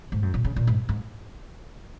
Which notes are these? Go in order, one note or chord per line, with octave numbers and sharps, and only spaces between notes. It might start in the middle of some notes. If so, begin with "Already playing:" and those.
G#2
F#2
A#2
C#3
A#2
G#2
G#2